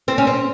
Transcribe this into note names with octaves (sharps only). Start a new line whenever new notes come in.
C4
C#4
C4